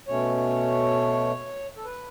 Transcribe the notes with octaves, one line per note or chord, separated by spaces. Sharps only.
B2 A3 C#4 C#5
A4
B4